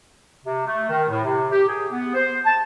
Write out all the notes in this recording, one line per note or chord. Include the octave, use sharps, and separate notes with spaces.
C3
A3
D#3
A2
C3
G4
G#4
B3
C5
A5